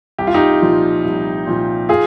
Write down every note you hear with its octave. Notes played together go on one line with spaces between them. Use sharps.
C2 G4
F4
D#4 G4
A#2 F3
C2
A#2 F3
F4 G#4